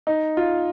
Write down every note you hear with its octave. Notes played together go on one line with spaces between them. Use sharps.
D#4
F4